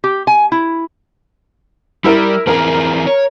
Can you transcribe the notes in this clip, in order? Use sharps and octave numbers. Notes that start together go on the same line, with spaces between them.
G4
G#5
E4
G3 E4 A#4
E3 C4 G#4 A#4 A#5
C#5